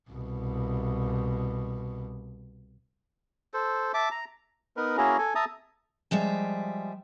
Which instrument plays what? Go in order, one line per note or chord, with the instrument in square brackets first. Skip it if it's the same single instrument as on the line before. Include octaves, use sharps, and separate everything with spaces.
[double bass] C2 B2
[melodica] A4 C5
E5 A5 D6
A#5
[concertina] B3 D#4 A#4 B4
A#3 C#4 E4 F#4 G#4 A#5
A4 G#5
E5 A5 A#5 D#6
[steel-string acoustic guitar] F3 G3 G#3 E5